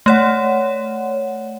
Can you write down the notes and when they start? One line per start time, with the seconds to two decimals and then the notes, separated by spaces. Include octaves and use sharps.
0.06 A3 C#5 F#5